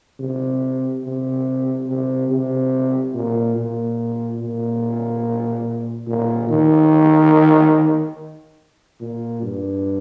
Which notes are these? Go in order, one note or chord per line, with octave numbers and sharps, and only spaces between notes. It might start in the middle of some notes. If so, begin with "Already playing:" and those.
C3
C3
C3
C3
A#2
A#2
A#2
A#2
D#3
A#2
G2